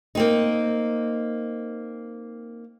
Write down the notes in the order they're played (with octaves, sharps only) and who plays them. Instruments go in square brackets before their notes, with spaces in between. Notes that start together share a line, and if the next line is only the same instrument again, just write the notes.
[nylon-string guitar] A#3 C4 D#4